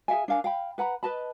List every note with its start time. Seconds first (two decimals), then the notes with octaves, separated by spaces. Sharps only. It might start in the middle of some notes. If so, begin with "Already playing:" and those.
0.08 G#4 E5 F5 G#5
0.28 D4 A#4 F5 G#5
0.44 F5 G5 B5
0.78 B4 F#5 A#5 B5
1.03 B4 D#5 A5 B5